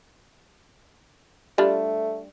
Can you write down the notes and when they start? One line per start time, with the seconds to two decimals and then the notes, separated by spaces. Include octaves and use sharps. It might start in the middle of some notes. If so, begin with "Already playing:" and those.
1.58 G3 A3 D4 F4